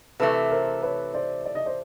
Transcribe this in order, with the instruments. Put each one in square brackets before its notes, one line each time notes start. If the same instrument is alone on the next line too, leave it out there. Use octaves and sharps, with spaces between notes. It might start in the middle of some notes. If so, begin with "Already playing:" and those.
[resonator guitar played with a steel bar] C3 E3 A3 [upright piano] A4 B4
[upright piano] A#4 C5
B4 C#5
C5 D5
D5
D#5
C5 D5